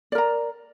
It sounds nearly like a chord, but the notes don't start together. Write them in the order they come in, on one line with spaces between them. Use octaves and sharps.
D5 A#4 A#5